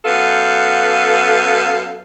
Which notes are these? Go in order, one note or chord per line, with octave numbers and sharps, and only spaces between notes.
F#2 B3 A4 F5